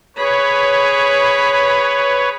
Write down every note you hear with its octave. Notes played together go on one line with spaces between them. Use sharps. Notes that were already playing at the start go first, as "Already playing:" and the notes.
G#4 B4 C#5 B5